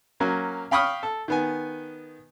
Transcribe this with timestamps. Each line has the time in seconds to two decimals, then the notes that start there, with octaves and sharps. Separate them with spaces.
0.20 F#3 A#3 C#4
0.71 F5 G5 B5 C#6 D#6 F6
1.03 A4
1.28 D#3 B3 G#5